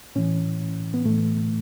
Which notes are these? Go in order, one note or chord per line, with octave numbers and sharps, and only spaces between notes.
A2 E3 C#4
B3
A2 E3 A3